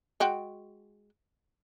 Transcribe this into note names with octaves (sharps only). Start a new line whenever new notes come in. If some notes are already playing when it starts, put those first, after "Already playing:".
G#3 F#4 G5